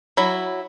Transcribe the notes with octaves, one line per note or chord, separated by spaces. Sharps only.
F#3 E4